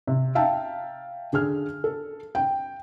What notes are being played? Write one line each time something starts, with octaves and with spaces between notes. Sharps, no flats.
C3
E5 F5 G5 A5 A#5
D3 G#4 F6
A4
G5